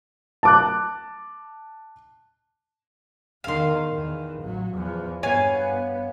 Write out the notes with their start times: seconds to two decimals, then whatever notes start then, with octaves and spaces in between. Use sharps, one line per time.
0.43 A5 D6 F#6
3.44 E2 D#3 F5 C6
3.91 E2 D#3
4.42 A1 F#3
4.74 E2 F3
5.23 G2 B3 C#5 F5 G#5